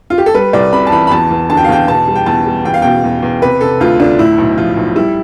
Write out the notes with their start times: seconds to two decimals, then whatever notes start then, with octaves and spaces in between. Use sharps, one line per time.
0.10 F4
0.18 G4
0.26 A4
0.34 G3 B4
0.53 C2 D5
0.73 C3 B5
0.87 A5
0.92 E3 B5
1.07 B5
1.11 E2 A5
1.30 E2
1.50 D3 A5
1.57 G5
1.64 F5
1.69 E2 G5
1.88 B2 A5
2.08 G3
2.15 G5
2.26 E2 A5
2.46 G3
2.65 E2 G5
2.74 F5
2.82 B2 G5
3.04 E2
3.23 E2
3.42 C3 B4
3.61 C3 A4
3.80 D2 F4
4.00 D2 D4
4.19 A2 E4
4.38 B1
4.57 F3 F4
4.77 B1
4.96 G3 E4